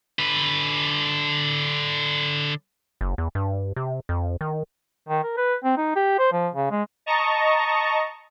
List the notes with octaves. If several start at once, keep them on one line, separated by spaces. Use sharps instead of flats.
D3 B4
F#1
E2
G2
C3
F2
D#3
D#3
A#4
B4
C4
D#4
G4
C5
F3
C#3
G#3
D#5 A5 A#5 C#6